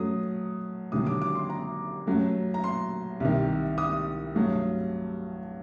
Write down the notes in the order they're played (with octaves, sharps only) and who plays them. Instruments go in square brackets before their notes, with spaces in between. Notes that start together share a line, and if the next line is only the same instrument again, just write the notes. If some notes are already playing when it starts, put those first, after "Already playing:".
Already playing: [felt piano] F#2 F#3 A3 D#6
D#2 D3 F#3 D#6
D6
D6
C6
A#5
F#2 F#3 A3
A#5
C6
C2 C3 D#3
D#6
G2 F#3 A3